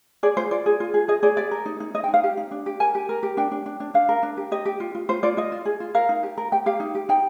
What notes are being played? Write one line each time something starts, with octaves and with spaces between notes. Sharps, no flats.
G#4 D5
F4 C5
F4 D5
G#4
F4
G#4
G#4 D#5
G#4 D5
G4 D5
A#4
D#4
D#4
D#4 D#5
G5
D#4
F5
G4
D#4
D4
G4
A#4 G#5
G4
A#4
G4
D4 G5
D4
D4
D4
D4 F5
A#4
D4
G4
G4 D#5
G4
F4
F4
F4 C5
F4 D5
F4 D#5
F4
G#4
F4
A#4 F5
D#4
G4
A#4
G4 G5
G4 F5
D#4
G4
D#4 G5